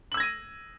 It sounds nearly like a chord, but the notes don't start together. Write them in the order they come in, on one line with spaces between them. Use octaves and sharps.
F#7 E6 G#6 A#6 D#7